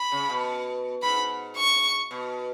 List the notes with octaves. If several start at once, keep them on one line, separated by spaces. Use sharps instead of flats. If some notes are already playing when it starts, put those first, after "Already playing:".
Already playing: B5
C#3
B2
G#2 B5
C#6
B2